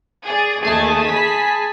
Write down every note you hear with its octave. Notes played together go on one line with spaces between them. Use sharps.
G#4 D5
D#2 A3 G#4 G#5 A5
B5 B6